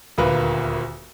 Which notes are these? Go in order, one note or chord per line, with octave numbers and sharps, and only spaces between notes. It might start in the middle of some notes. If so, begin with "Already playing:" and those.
D#1 D2 A#3 B4